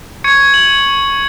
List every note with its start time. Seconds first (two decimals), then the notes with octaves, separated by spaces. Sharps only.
0.24 C#6 G#6 C#7
0.54 F#7